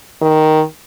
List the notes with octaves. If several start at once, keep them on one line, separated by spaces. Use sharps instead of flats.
D#3